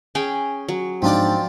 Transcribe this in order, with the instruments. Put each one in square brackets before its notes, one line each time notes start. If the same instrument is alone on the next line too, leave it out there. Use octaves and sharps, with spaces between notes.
[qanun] C#4 G#4 G5
F#3
[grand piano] G#2 D4 [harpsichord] F3 F4 D5 [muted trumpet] C4